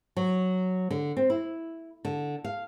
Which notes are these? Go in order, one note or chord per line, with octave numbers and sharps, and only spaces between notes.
F#3
D3
C4
E4
D3
F5